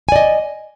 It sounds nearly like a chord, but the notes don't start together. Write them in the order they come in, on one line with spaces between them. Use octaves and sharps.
G#5 D5 D#5